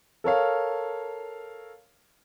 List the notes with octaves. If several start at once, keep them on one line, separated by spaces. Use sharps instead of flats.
A4 A#4 C#5 F5